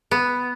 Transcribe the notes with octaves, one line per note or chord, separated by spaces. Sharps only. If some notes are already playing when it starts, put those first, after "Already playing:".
B3